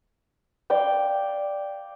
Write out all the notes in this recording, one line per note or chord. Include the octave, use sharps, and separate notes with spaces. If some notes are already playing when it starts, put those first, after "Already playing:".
D5 F5 G5